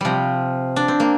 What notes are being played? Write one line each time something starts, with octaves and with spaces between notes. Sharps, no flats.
C3 F3 G3
D4
C4
A#3